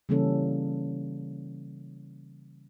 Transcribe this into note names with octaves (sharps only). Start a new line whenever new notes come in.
C#3 E3 G3 A#3 C#4 A4